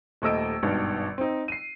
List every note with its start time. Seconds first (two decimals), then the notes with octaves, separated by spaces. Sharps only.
0.22 D#1 D#2 A3 D#5 E6 D7
0.63 G#1 G2 B2 D#3
1.18 C4 D#4
1.48 C7 D#7